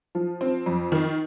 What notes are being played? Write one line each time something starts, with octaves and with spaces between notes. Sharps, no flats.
F3
C4
F2
D#3